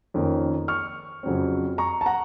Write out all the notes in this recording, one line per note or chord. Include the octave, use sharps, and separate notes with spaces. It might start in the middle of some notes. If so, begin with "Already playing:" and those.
F2 D#3 A#3 C#4
C#6 F6
F2 C#3 F#3 C4
A#5 C#6
A5
F#5 A#5